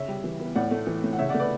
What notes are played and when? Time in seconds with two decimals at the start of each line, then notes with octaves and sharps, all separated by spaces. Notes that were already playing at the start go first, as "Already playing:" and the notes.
Already playing: C#3 C#5 E5
0.08 G3
0.24 E3
0.40 B3
0.56 A2 D5 F#5
0.71 A3
0.87 E3
1.04 A2
1.13 F#5
1.19 C#3 C#5 E5
1.29 D5 F#5
1.34 A3
1.40 B4 D5